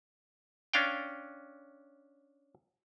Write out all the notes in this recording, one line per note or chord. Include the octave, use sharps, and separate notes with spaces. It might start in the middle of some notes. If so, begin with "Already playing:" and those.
C#4 D4 F5 G5